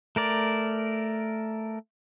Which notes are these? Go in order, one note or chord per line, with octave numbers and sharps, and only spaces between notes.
A3 A#4 D5